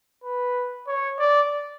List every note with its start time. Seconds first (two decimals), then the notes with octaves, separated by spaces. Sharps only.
0.24 B4
0.88 C#5
1.19 D5